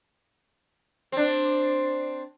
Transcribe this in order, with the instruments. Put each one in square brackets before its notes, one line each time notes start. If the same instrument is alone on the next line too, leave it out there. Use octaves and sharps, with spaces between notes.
[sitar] C4 D4